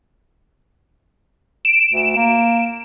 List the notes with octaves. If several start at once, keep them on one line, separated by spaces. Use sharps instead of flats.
D7 E7
D2
A#3